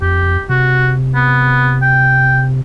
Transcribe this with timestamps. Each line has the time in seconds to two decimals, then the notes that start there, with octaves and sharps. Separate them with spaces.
0.02 F2 G4
0.49 C3 F#4
1.15 B3
1.82 G5